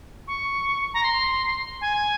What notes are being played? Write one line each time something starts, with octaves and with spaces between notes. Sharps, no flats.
C#6
A#5
C6
G#5